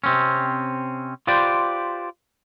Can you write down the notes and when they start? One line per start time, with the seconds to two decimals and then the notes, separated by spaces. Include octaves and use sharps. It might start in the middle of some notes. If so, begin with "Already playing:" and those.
0.04 C3 C4 C#4
1.27 F4 G4 B4 C5 D5